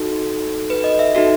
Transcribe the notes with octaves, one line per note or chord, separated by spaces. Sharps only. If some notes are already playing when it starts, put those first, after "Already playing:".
Already playing: D#4 F#4 A4
B4
D#5
E5
D#4 F#4 A4